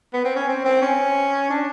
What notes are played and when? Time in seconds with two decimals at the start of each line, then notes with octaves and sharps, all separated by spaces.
0.13 B3
0.24 C4
0.36 C#4
0.47 C4
0.65 C4
0.82 C#4
1.50 D4